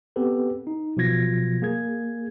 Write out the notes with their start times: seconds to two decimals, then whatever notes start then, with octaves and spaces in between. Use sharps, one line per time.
0.16 B3 C4 G4 A4 B4
0.67 D#4
0.97 B2 F3 F#3 F4 G#6 A#6
1.62 A#3 G#4 G#6